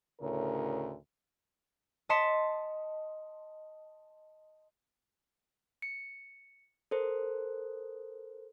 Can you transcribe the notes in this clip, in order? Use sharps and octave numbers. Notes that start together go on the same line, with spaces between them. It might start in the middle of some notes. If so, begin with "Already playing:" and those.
D2 A2 C#3 A#4 C#5
D#5 A5 C6 B6 C#7 E7
C#7
A4 A#4 C5